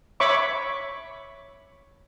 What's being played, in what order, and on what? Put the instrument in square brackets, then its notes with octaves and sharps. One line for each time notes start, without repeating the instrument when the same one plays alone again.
[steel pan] C#5 E5 B5 C#6 D6